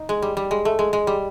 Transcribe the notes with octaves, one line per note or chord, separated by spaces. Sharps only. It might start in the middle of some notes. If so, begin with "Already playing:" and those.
Already playing: D#4
G#3
G3
G3
G#3
A3
G#3
G#3
G3